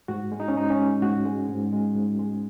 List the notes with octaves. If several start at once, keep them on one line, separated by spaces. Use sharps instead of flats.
G#2 F#4
G#3
D#4
C#4
G#2 D#4
C#4
G#3
G#2 F#4
G#3
G#2
G#3
G#2
G#3